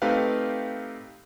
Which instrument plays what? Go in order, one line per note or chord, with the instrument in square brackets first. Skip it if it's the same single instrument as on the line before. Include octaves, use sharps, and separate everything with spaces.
[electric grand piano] A3 C4 D#4 G4 B4 F5